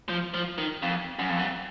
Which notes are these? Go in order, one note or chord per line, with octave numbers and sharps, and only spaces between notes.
F3
F3
D#3
F2
F#2
F2
F#2